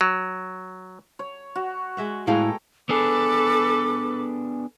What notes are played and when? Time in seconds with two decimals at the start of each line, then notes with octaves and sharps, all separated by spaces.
0.01 F#3
1.19 C#5
1.56 F#4
1.97 G#3 E5 F#5
2.27 A2 G#3 B3 E4 A4 F5 G5 A#5
2.89 B3 D4 G#4 A4 B4 D6